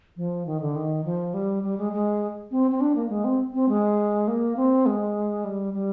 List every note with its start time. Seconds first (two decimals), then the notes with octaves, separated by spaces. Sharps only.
0.17 F3
0.46 D#3
0.61 D3
0.76 D#3
1.05 F3
1.34 G3
1.63 G3
1.78 G#3
1.92 G#3
2.51 C4
2.71 C4
2.81 D4
2.96 A#3
3.10 G#3
3.24 C4
3.54 C4
3.69 G#3
4.28 A#3
4.57 C4
4.86 G#3
5.44 G3
5.74 G3